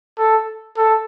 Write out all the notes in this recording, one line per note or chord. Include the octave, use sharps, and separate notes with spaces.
A4
A4